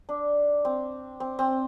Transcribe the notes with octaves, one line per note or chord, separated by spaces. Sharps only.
D4
C4
C4
C4